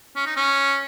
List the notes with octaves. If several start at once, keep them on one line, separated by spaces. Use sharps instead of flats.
C#4
D#4
C#4